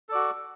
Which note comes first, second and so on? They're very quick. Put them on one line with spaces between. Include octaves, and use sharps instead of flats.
A4 D5 F#4